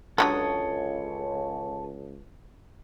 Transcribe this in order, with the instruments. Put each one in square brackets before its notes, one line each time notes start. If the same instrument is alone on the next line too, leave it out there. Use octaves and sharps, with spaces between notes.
[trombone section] C#2 [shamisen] D3 D#3 F#3 [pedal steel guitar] A4 C#5 D#6